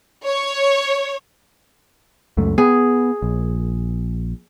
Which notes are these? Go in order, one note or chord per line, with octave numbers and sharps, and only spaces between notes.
C#5
C#2 F#2 A3
B3 G#4
A#1